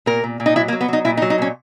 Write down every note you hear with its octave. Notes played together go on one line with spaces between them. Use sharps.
A#2 A#4
A#2
A#2
D#4
F#3 E4
A#3
F#3
B3
F#3 D#4
A#2 E4
D#4
F#3
D#4
A#2 C#4